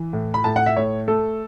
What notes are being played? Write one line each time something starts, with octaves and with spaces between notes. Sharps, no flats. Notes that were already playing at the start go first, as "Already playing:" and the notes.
Already playing: E3
A2
B5
A2 A5
F#5
E5
A2 C#5
A3 A4